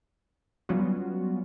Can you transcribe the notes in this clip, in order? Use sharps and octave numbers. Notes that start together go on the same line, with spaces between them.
F#3 G3 B3 C#4 F4 F#4